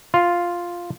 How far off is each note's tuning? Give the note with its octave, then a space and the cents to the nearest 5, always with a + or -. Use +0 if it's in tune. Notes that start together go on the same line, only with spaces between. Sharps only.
F4 +0